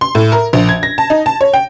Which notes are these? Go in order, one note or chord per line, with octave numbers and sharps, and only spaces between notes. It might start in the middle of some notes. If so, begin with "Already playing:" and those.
C6
A2
A#4
A#1
G#6
A#6
A5
D#4
A5
C#5
G5